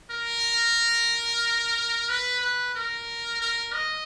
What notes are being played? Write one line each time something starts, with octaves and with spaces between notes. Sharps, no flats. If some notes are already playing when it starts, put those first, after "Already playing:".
A#4
B4
B4
A#4
A#4
D#5